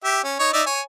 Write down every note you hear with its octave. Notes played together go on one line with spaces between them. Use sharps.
G4 E5
C#4
D#4 C#5
D#4 D5 E5
C#5 G#5